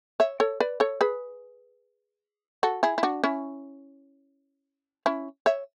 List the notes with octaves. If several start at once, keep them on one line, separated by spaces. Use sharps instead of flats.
C#5 E5
A4 C#5
B4 D5
A4 C#5
G#4 B4
F#4 A4
E4 G#4
E4
D4 F#4
C#4 E4
C#4 E4
C#5 E5